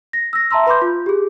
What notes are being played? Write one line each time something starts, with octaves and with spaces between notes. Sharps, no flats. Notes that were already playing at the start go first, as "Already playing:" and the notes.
A#6
E6 A#6
E5 A5 A#5 C6 E6
B4 B5 C6 D6 G6
F4
G4 G#4